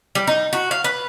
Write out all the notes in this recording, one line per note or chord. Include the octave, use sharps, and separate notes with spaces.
G3
D#4
F#4
F5
B4